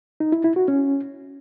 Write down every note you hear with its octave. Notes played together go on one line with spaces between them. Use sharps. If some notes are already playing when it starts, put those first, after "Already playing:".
D#4
E4
E4
F#4
C#4